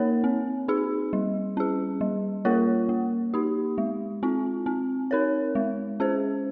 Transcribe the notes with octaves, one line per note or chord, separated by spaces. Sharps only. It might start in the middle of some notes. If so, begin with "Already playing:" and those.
Already playing: A#3 D#4 A#4 C#5
C4
D#4 G#4
G3
C#4 G#4
G3
A#3 F4 A#4 C#5
A#3
D#4 G4
G#3
C4 F4
C4
D#4 A#4 C#5
G#3
C#4 G#4 C5